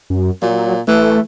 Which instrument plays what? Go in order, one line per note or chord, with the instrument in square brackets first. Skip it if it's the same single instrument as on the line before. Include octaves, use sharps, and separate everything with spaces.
[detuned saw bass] F#2
[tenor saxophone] A#2 [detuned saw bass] F#3
[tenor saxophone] E3 [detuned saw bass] A3